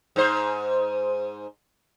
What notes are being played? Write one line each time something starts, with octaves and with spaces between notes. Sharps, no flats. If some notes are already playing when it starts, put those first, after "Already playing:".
G#2 C5